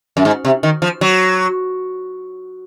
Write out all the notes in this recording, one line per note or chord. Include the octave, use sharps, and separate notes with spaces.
F#2
G#2
C3
D#3
F3
F#3